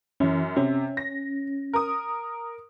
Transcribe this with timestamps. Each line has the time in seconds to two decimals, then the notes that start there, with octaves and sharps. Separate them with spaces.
0.20 F#2 E3 C#4
0.57 C3 C#4
0.97 A#6
1.73 A#4 D#6